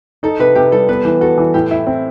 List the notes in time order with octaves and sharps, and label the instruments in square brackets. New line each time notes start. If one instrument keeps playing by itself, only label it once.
[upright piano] D#4 [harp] A4
[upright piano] C3 [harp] B4
[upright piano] C3 [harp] G4
[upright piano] G3 [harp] A4
[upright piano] B3 [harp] B4
[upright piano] E3
[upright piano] F#4 [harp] A4
[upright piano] E3
[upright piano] A2 [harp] G4
[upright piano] E4
C4